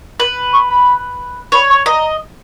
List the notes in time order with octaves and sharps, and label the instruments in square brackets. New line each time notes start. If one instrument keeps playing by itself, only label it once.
[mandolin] B4
[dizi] C#6
B5
[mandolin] C#5 [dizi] B5
[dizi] C#6
[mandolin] D#5 [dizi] A#5